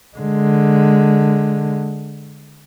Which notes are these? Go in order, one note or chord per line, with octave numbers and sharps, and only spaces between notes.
D3 G#3